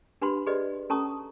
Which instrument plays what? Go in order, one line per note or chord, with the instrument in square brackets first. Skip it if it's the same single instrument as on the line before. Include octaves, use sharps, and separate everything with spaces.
[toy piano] D4 G4 B4 F#5 B5 C6
G4 G#4 B4 C5 D5 D#5
C#4 A4 A5 A#5 C#6 D#6